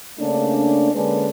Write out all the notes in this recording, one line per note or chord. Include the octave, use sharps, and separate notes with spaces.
C#3 A3 A#3 C#4 D4
D3 G#3 A#3 C#4 D4 B4